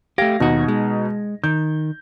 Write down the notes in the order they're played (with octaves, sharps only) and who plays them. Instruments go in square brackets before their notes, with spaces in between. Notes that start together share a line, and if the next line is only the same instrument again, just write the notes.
[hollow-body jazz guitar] A3 G4 [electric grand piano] F5 G#6 A#6
[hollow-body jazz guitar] D#2 F#4 [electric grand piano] B2 D#4
[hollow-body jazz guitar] G#3
[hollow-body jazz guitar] D#3 [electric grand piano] G6